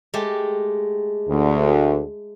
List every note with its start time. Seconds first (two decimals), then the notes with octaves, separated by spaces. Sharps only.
0.14 G#3 A3 G4
1.28 D2